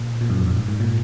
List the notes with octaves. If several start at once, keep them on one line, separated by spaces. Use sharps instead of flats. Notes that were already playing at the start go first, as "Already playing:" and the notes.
Already playing: A#2
A#2
F#2
F2
F#2
G#2
G#2
A#2